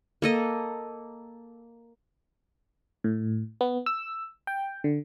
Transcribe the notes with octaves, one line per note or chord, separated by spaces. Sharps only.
A#3 A4 D#5
A2
B3
E6
G5
D3